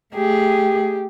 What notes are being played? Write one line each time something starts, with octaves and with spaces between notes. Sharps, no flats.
A3 G4 G#4